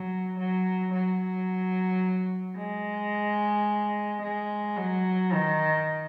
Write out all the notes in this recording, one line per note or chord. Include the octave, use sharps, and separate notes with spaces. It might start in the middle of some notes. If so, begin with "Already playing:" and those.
Already playing: F#3
F#3
F#3
G#3
G#3
F#3
D#3